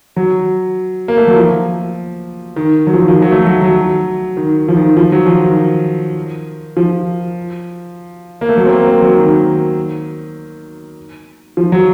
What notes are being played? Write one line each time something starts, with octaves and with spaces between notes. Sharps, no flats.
F#3
A#3
A3
F#3
F3
D#3
F#3
F3
D#3
F3
F#3
A3
F#3
F#3
D#3
F3
D#3
F3
F#3
F3
D#3
F3
A#3
A3
F#3
C4
A#3
C4
F#3
D#3
F3
F#3